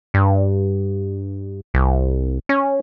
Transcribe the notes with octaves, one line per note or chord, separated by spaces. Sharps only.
G2
C2
C#4